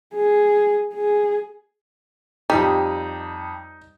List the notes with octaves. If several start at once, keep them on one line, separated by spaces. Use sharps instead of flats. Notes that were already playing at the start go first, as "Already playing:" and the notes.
G#4
G#4
F2 G3 D#4 G4